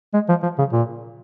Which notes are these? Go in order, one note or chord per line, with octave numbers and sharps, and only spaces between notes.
G#3
F3
F3
C#3
A#2